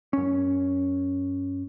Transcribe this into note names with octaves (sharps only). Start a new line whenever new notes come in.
F#2 C#4